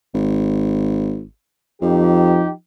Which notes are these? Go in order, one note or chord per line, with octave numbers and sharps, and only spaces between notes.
G#1
F2 F3 D#4 G4